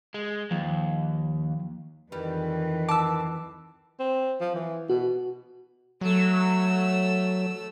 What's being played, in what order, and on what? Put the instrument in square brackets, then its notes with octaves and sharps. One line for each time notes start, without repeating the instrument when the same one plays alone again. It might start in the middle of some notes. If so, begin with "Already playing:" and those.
[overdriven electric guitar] G#3
[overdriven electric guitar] D#2 [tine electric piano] F3
[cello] F2 E3 [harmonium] D#3 B4 [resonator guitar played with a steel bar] G3
[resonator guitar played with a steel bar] A5 [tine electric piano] D6 E6
[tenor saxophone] C4
F3
E3
[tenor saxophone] B2 [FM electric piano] F#4
[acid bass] F#3 [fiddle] A3 E6